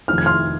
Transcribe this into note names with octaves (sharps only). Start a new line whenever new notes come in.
F1 F2 D#3 F6
G#6
C6 F6